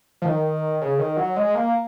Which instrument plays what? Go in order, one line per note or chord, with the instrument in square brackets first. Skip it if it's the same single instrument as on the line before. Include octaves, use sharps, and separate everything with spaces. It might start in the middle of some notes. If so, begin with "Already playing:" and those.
[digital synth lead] F3
D#3
C#3
D#3
F#3
G#3
A#3